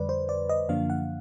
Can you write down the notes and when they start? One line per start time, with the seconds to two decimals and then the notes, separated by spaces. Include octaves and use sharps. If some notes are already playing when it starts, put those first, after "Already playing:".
Already playing: F2 D3 G3 B4 D5
0.09 C5
0.29 D5
0.49 D#5
0.69 F#2 D3 F3 A#3 D4 F5
0.90 F#5